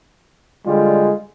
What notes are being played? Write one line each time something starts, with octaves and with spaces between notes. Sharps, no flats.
D3 G3 G#3 F4